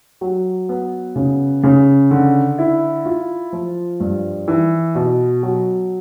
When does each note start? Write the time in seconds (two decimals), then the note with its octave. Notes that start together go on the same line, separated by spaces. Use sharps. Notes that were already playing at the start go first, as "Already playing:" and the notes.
0.21 F#3
0.69 B3
1.16 C#3
1.63 C#3
2.11 D3
2.58 E4
3.05 F4
3.53 F3
4.00 G2
4.48 E3
4.95 B2
5.43 F#3